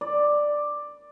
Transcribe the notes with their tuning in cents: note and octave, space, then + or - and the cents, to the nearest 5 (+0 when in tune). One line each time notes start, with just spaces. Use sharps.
D5 +5